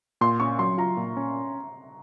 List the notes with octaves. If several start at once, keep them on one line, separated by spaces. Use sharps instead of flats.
A#2 C6
C#4 C#6
F#3 C6
F4 A#5
A#2
C#4